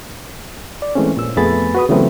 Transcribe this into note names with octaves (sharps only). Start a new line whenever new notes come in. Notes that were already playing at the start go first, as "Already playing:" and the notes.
D5
E3 G#3 A3 C4 C#4
A#2 E6
F2 A3 B3 G#4 B5 A6
F#4 B4 D#6
C#3 E3 F#3 A3 B3 C4